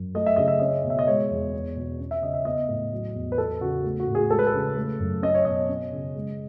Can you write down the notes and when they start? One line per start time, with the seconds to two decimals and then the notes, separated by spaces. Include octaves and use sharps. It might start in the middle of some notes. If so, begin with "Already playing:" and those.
Already playing: F#2
0.15 A3 D#5
0.26 E5
0.36 C#3 D#5
0.48 E5
0.60 C#4 D#5
0.84 B2
0.90 E5
0.99 D#5
1.07 G#3 C#5
1.30 E2
1.53 B3
1.76 B2
2.00 C#4
2.11 E5
2.22 C#3 D#5
2.34 E5
2.45 B3 D#5
2.68 A2
2.92 F#3
3.15 E2
3.32 B4
3.38 B3 A4
3.61 C#3 F#4
3.84 A3
4.00 F#4
4.07 A2
4.15 G#4
4.30 G#3 A4
4.39 B4
4.47 A4
4.54 C#3
4.77 A3
5.00 F#2
5.22 C#4 D#5
5.34 C#5
5.45 B2 D#5
5.69 C#4
5.92 C#3
6.16 G#3